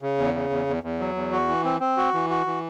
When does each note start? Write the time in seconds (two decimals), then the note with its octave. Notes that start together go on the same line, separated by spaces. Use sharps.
0.02 C#3
0.18 E2
0.34 C#3
0.50 E2
0.67 E2
0.83 E2
0.99 F#3
1.15 E2
1.32 F#4
1.48 E3
1.64 C4
1.80 C4
1.97 F#4
2.14 E3
2.30 F#4
2.46 E3